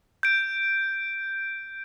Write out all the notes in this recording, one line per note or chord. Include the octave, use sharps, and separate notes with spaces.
G6 D7